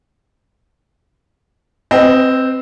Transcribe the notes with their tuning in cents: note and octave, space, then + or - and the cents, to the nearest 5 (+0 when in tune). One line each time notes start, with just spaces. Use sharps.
C4 +0 B4 +30 D#5 +0